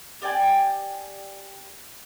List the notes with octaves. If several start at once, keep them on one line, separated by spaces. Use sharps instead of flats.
G4 D5 G5 G#5